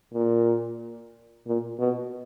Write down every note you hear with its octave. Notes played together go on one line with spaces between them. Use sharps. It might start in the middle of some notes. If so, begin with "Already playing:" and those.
A#2
A#2
B2